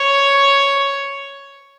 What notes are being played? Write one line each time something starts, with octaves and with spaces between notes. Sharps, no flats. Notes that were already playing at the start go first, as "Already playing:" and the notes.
Already playing: C#5